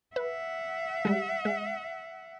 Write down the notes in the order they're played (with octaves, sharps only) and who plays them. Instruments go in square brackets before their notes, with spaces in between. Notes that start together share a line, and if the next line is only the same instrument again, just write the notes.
[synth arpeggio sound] B4 [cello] E5 F#5
[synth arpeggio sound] G3 G#3
G#3